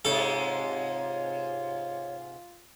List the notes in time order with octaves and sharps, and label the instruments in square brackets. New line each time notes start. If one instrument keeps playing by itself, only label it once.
[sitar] G#2 C3 G#3 [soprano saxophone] F4 [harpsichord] A4 [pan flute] C#5